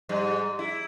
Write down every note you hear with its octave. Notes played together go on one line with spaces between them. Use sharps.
G#2 G3
E4